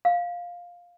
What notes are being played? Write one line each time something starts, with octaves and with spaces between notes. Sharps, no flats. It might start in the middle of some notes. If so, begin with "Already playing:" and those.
F5